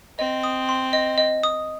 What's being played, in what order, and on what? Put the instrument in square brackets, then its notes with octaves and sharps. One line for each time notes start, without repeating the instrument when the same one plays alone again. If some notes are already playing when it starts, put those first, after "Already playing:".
[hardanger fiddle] C4 [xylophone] D#5
[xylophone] D#6
C6
D#5
D#5
D#6